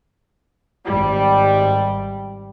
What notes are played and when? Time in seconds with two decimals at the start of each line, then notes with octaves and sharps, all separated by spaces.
0.86 G#1 G3